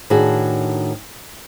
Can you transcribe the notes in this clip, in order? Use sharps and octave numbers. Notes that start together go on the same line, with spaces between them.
A2 D#3 D4 F#4 G#4